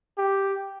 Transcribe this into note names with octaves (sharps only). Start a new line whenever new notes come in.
G4